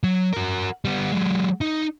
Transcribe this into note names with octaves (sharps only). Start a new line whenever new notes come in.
F#3
F#4 A#4
G3 B3
F#3 G#3
D#4